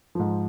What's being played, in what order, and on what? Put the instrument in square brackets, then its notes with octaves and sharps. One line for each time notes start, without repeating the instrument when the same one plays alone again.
[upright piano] G#2 F3